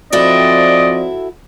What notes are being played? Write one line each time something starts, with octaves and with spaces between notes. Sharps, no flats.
F3 C4 E4 F#4 A4 D5 D#5